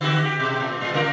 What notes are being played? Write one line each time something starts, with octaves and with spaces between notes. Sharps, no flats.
D3 F#4 G4
G4
B2
A2
A2 G3 F4
C#3 F4 A#4